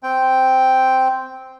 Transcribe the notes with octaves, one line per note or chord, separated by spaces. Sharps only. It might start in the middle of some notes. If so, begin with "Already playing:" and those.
C4 G5